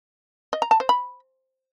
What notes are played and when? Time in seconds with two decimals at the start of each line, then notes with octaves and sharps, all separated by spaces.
0.53 D#5
0.62 A#5
0.71 A5
0.80 C5
0.89 B5